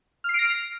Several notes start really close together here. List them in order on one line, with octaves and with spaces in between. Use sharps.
F6 C7 D7 A#6